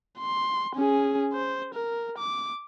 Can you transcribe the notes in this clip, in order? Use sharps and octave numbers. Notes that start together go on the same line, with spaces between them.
C6
C#4 G#4
C5
A#4
D6